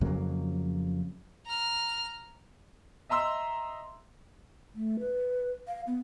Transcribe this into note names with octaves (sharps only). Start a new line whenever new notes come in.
F2 C#3 F#3 A#3
A#5 F6
D#5 E5 A#5 C6 E6
A3
B4
F5
B3